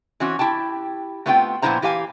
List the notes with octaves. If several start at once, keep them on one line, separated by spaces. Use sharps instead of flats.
E3 C4 C#4 F#4
E4 G4 G5 A5
A3 B3 C4 F4 E5 G5
A#2 F3 B3 E4 C5 A#5
E3 G4 F5 G#5